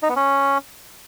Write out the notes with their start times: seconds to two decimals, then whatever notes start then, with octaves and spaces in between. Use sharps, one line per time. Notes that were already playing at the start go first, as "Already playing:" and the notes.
0.03 D#4
0.09 B3
0.16 C#4